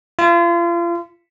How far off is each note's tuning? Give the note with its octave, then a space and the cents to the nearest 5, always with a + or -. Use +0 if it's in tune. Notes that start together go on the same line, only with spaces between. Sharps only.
F4 -35